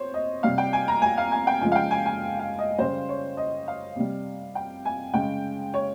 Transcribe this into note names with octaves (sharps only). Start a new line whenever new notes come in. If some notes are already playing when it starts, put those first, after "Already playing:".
Already playing: C3 C5 C#5
D#5
C3 G3 F5
G5
G#5
A#5
G#5
F5
G#5
G5
C#3 F3 G#3 G#5
F5
G5
G#5
G#5
F5
D#5
C#3 G3 C5
C#5
D#5
F5
C3 G3
G5
G#5
C#3 G#3 G5
C#5